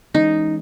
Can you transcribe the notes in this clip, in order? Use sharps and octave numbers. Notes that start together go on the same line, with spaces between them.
E3 G#3 C#4 D#4